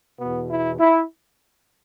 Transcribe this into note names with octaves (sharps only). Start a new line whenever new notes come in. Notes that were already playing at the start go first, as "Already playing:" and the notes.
E2 B2 B3
E4
E4